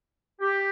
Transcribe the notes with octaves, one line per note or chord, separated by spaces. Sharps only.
G4